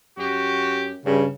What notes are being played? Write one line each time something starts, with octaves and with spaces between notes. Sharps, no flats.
F#2 F#4 G4
G2 C#3